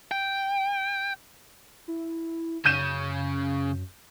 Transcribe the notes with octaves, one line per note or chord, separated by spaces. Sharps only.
G5
E4
F#2 C#3 G6 D#7 E7